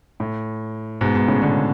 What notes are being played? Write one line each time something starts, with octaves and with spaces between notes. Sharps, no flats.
A2
G#2 B2
G#2 B2
A2 C#3
B2 D3